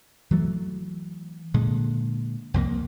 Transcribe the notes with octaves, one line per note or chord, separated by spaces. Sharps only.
E3 F#3 A3
A#2 D3 G#3
C2 F2 F#3 A#3